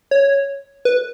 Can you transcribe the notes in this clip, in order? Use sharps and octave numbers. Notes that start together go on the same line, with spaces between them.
C#5
B4